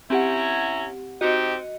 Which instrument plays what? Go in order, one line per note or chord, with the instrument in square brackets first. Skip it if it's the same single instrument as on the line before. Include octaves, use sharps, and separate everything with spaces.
[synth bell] C4 G4 F#5 [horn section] C#4 E4 A#5
[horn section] C4 D#4 G4 [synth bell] F#4 D#5